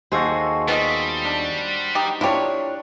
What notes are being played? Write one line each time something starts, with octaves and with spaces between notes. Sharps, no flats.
D#2 F#4 G#4 A4 C5
G3 B3 F4 D#5
D4
D#4 G4
D4 E4 F4 G4 C#5